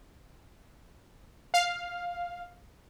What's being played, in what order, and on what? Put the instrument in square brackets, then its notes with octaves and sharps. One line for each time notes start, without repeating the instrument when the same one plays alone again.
[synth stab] F5